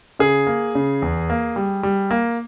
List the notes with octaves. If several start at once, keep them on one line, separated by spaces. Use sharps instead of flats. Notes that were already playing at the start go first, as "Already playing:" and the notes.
C#3 G#4
A#3
C#3
E2
A#3
G3
G3
A#3